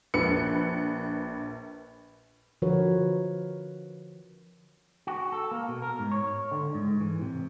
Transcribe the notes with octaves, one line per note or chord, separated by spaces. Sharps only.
A#1 B4 C#7
D3 F3 F#4 A#4 B4 C#5
F#4
A4
A#3
B2
A#4
G#2
C#5
D3
G#2
E3
C3